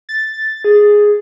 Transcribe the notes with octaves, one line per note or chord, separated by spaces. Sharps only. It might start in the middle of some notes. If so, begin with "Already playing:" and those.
A6
G#4